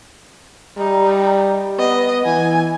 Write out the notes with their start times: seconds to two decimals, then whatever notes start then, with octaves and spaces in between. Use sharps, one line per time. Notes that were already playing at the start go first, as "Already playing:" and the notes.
0.77 G3 D#4
1.79 B3 D#5
2.26 E3 G#5